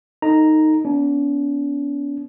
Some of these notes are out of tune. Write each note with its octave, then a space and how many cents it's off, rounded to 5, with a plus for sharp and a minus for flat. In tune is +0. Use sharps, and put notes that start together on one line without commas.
D#4 +0 A4 +35 A#5 +0
B3 +5 D4 -45